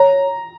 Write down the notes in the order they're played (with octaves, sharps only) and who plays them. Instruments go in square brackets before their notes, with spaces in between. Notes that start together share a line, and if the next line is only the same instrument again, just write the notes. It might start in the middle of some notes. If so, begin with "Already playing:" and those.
Already playing: [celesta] C#5 [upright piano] A#5